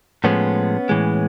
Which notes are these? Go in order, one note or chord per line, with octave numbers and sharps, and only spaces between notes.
A2 F3 G#3 B3 C#4
A2 E3 G#3